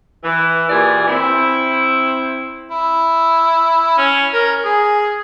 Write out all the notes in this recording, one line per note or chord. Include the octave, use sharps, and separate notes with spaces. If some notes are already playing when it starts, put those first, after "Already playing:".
E3
A#2 E3 G4 G#4 D5
C4 E4
E4
C#4
A#4
G#4